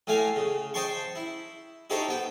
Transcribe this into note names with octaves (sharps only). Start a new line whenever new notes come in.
A2 A3 F5 G#5
C#3
C5 D#5 G5 A5 C6 C#6
E4
D#4 E4 G4 A4 C5 C#5
B3 G5